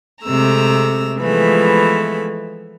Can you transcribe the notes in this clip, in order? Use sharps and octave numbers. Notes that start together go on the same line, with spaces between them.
C3 G#3 A3 A#5 E6
E3 F3 G#3 A3 B3 B5